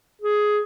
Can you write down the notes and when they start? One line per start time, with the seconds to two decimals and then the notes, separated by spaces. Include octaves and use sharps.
0.22 G#4